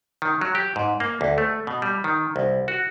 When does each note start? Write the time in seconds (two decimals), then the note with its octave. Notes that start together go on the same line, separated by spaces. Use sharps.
0.22 D#3
0.41 F#3
0.55 G4
0.76 G#2
1.00 A#3
1.21 D2
1.38 A3
1.67 B2
1.82 G3
2.04 D#3
2.36 C2
2.68 F#4